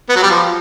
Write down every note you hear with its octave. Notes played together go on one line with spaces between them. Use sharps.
B3
F#3
G3
F3